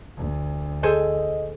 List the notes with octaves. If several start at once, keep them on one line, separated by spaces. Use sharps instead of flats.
D2
G#4 A4 C5 D#5